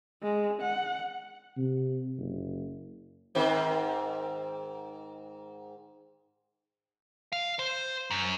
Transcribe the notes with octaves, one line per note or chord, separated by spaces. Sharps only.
G#3
F#5
C3
F#1
G#2 D#3 C4
F5
C5
F#2